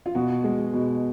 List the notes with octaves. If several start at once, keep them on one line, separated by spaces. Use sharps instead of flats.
F4
B2 F#4
G#3
B2